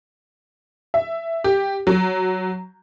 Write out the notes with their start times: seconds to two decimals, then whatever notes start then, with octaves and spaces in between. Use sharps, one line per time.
0.94 E5
1.44 G4
1.87 F#3